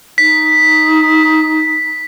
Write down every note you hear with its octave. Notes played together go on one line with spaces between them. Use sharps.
D#4 B6